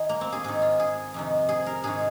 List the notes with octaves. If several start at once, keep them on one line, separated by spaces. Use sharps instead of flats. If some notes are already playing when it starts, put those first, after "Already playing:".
Already playing: D#3 G#4
A#3
C4
G#4
G#2 D#3 G#4
F4
G#4
F2 C3 D#3
G#4
A#4
G#2 D#3 G#4